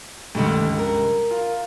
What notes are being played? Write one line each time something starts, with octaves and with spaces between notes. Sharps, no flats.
C#2 G2 D3 D#3 A3
A#4
F4